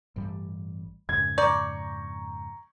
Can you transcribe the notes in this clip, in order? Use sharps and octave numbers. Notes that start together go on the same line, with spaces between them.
A1 G2 G3
F2 G#2 C#3 G#6
D5 A#5 C#6 G6